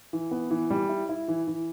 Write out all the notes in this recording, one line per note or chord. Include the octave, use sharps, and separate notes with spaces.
E3
B3
E3
G3
E4
E4
E3
E3